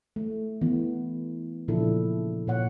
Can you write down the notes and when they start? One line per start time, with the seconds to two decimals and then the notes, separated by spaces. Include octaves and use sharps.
0.16 A3
0.61 E3 B3
1.68 A#2 C#3 F3 D4 E4 A4
2.47 A#2 C#5 F#5